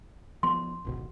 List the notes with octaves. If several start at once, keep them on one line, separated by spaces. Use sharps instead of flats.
F3 B3 C6
D1 G#1 B2